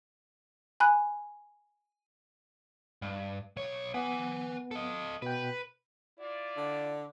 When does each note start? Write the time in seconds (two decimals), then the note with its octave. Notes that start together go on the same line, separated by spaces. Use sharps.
0.80 G#5 B5 F#6
3.02 G2
3.57 B1 C#5
3.94 B3 B4 G#5
4.71 A4 D#5
5.22 B2 B4 G5
6.19 E4 F4 D5
6.57 D3